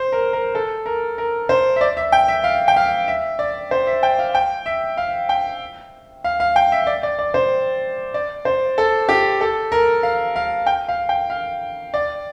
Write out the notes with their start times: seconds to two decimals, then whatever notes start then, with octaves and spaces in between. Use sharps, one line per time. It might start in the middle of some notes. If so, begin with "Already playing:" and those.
Already playing: C5
0.12 A#4
0.33 A#4
0.55 A4
0.86 A#4
1.18 A#4
1.49 C5
1.76 E5
1.81 D5
1.97 E5
2.12 G5
2.28 E5
2.44 F5
2.68 G5
2.76 F5
3.08 E5
3.39 D5
3.71 C5
3.87 E5
4.03 G5
4.19 F5
4.35 G5
4.66 E5
4.97 F5
5.29 G5
6.24 F5
6.40 F5
6.56 G5
6.72 E5
6.87 D5
7.03 D5
7.19 D5
7.34 C5
8.14 D5
8.45 C5
8.78 A4
9.09 G4
9.41 A4
9.72 A#4
10.03 F5
10.36 F5
10.66 G5
10.89 F5
11.09 G5
11.30 F5
11.94 D5